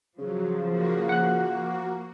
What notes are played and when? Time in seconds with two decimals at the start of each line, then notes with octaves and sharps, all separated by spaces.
0.18 C#3 F3 F#3
0.70 A#3 F#4
1.09 F#5 F#6